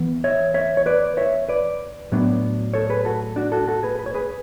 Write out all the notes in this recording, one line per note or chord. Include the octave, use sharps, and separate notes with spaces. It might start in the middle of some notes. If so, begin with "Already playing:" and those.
Already playing: E3 B3
C#5 E5
C#5 E5
C#5
B4 D5
C#5 E5
B4 D5
A2 F#3 B3 D4
A4 C#5
G#4 B4
F#4 A4
D4 F#4
F#4 A4
F#4 A4
G#4 B4
B4
C#5
G#4 B4